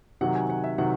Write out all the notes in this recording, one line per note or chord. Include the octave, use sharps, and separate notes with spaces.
C3 D#3 F#3 F#5
G#5
F#5
E5
C3 D#3 F#3 F#5